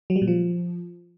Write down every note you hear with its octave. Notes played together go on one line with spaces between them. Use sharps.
F#3
G3
A#2
F3